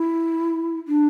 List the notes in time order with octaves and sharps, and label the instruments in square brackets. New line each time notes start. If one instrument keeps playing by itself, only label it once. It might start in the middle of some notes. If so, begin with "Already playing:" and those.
Already playing: [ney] E4
D4